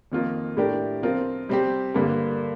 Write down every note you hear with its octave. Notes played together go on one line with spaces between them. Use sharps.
F2 D#3 A#3 F4 A#4
A2 A3 D4 G4 A#4
F3 C4 F4 A#4
C3 G3 C4 G4
G2 D3 G3 A#3